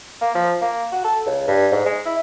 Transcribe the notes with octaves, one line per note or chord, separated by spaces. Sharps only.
A#3
F3
A#3
F#4
A4
C#2
G2
G#2
G#3
E4